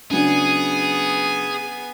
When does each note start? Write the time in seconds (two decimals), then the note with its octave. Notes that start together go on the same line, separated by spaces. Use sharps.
0.11 C#3 F#3 B3 D4 G#4 G#5